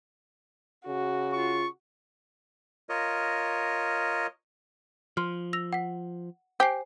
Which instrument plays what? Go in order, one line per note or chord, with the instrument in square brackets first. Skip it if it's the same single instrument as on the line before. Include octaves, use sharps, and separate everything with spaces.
[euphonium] C#3 [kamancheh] F#4
[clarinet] F4 [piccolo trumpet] C#6
[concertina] F4 A#4 C#5 D#5
[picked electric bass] F3 [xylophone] C6 F6
[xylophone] E6 A#6 F7
F#5 B6
[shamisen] G4 [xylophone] C5 G#5 C7